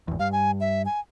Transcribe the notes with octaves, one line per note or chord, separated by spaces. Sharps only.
G#1 E2
G2 F5
G#5
E5
G#5